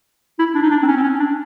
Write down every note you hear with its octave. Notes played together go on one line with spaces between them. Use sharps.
E4
D4
D#4
D4
C4
C#4
C4
C#4
D4